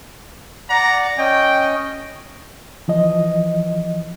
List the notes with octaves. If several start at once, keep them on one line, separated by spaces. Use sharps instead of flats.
D5 F#5 A#5
C#4 D#5 G5
E3 F3 D#5